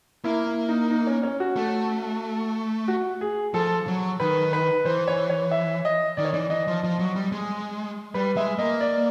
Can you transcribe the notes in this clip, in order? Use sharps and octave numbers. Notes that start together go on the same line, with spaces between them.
A#3 E4
E4
D#4
D#4
C#4
C#4
F#4
A3
F#4
G#4
F3 A4
F#3
D#3 B4
B4
E3 C5
C#5
C#5
E5
D#5
D#3 D5
C#5
E3 D5
E3 D#5
F3
F3
F#3
G3
G#3
G3 B4
G#3 E5
A#3 D#5
D5